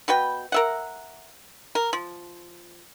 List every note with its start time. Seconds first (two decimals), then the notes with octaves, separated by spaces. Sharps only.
0.08 B2 F#4 B4 G5
0.52 A#4 E5 F#5
1.75 A#4
1.93 F3